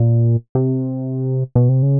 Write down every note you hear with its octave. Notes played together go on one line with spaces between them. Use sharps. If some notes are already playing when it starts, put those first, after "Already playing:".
Already playing: A#2
C3
B2
C3
C#3